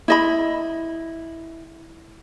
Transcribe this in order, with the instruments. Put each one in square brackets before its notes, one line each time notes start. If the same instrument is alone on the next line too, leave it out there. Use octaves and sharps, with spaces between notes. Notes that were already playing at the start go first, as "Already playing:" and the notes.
[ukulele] E4 D#5 B5